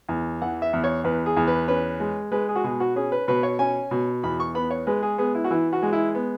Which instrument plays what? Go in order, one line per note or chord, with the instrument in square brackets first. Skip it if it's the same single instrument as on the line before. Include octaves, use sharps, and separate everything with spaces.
[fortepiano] E2
E3 F#5
E5
E2
C#5
E2 B4
G#4
E2
B4
C#4 B4
G#3
G#3 B4
G#4
F#4
B2 G#4
F#4
C#4 G#4
B4
B2 B4
C#5
C#4 G#5
B2
E2 B5
C#6
B3 B5
C#5
G#3 B4
G#4
B3 G#4
E4
F#4
E3 E4
F#4
G#3
E4
B3